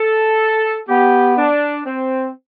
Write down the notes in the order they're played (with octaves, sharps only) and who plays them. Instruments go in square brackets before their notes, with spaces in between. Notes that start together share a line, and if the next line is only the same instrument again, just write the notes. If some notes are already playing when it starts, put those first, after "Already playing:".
Already playing: [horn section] A4
[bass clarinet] B3 [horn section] G4
[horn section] D4
C4